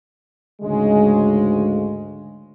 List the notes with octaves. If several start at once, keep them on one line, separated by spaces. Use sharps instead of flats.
D2 G#2 C#3 G#3